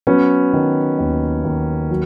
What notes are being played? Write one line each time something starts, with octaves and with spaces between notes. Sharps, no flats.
F#3 B3 C#4
D#3
D#2
D#2
F#3